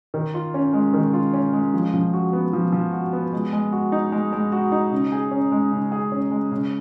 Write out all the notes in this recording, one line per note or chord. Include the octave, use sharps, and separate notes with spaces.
D#3
F4
C#4
G#3
D#3
F4
C#4
G#3
F3
F3
F#4
B3
F3
F3
F#4
B3
G#3
G#3
F#4
D#4
G#3
G#3
F#4
D#4
C#3
G#4
C#4
G#3
C#3
G#4
C#4
G#3
C#3